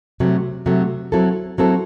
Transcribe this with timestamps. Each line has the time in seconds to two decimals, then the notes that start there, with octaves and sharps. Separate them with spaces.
0.20 C3 F#3 A3
0.66 C3 F#3 A3
1.12 F#3 C4 E4 A4
1.58 F#3 C4 E4 A4